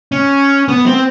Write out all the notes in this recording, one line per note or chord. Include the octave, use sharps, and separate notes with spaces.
C#4
B3
C4